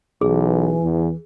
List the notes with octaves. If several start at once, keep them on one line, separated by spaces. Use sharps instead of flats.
B1 E3 G#4
E2